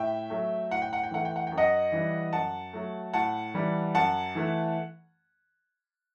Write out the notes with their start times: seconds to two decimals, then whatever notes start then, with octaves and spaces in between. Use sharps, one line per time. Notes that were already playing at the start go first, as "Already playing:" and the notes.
Already playing: A2 E5 G5
0.30 F#3 A3
0.71 A2 F#5
0.82 G5
0.93 F#5
1.04 G5
1.11 E3 A3 F#5
1.25 G5
1.36 F#5
1.47 F#2 G5
1.57 D#5 F#5
1.92 E3 G3
2.33 F#2 F#5 A5
2.73 F#3 A3
3.13 A2 F#5 A5
3.54 E3 G3
3.94 F#2 F#5 A5
4.35 E3 A3